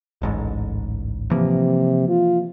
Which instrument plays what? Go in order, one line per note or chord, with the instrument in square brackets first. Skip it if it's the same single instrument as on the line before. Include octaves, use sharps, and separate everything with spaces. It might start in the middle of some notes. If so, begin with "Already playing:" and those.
[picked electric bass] D1 A1 G#2
[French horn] C3 [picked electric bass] E3 F3 A#3
[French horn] F4